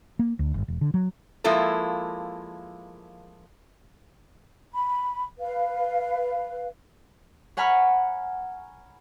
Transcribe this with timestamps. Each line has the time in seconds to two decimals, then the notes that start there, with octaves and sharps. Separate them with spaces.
0.19 A#3
0.39 D2
0.54 G1
0.68 E1
0.81 D3
0.94 F#3
1.44 F3 G#3 A#3 E4 F4 A4
4.73 B5
5.39 B4 F5
7.57 C#5 F#5 G#5 A#5 B5 F6